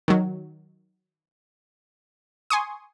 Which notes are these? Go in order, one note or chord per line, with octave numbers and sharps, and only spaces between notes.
D#3 F#3
G#5 C6 C#6 D#6